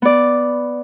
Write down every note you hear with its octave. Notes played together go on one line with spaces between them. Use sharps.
B3 D5